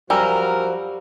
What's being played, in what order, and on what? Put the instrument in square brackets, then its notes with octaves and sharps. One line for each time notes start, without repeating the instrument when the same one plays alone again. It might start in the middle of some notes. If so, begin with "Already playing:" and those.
[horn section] F#2 A#4 [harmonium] F3 F#4 [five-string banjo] G3 [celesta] G#5 A#5 E6